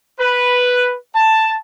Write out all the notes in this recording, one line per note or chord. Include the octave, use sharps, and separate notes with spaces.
B4
A5